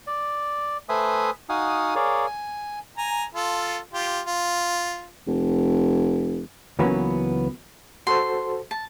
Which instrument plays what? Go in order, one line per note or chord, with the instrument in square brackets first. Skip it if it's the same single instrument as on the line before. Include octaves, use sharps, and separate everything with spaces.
[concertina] D5
A3 B4 C5 E5 G#5 D#6
D#4 F#4 F5 F#5 G#5 D#6
G#4 A#4 C#5 D5 F5
G#5
[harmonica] G#5 A#5
F4 A4
F4 G4
F4
[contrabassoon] F1
[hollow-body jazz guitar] C#2 E3 F#3 A#3 B3 C#4
[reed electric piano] F#4 A4 C5 [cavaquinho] C6
[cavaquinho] A5